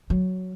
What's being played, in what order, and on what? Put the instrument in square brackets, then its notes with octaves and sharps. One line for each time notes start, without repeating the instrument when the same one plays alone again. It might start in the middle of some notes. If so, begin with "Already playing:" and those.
[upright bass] F#3